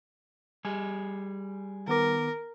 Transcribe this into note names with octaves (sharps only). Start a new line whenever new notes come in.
G3 G#4
D#3 B3 A#4 D6